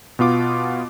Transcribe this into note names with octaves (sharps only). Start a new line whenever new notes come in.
B2 B3 F4 D6